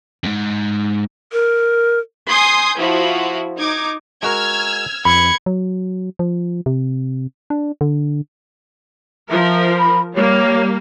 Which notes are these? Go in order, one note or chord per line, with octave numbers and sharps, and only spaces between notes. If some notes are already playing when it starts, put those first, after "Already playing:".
F2 G#2
A#4
G#5 C6 D#6 G6 G#6
F3 E4 F#4
D#4 D6 G#6
G#3 F#4 A#4 E6 F6 G#6
F2 B5 G#6 C#7
F#3
F3
C3
D4
D3
F3 A#4 E5
B5
G3 A#3 C#5